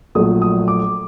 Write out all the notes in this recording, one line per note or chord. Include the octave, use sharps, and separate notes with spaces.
A#1 A#2 F#3 A3 D#6
D#6
D6